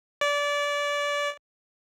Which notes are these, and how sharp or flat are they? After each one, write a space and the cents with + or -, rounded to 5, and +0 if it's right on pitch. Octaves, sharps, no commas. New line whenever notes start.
D5 -25